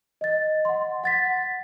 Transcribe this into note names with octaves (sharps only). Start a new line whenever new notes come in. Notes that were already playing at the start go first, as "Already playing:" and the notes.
D#5 A6
F#5 C6
F#5 A6 B6